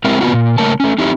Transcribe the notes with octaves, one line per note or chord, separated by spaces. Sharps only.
G#3 C4 E4 G4 A#4
B3 C#4 F4 F#4
A#2
C#3 A3 A#3 C#4 A#4 A5
A3 C#4
C4 D#4 E4 G4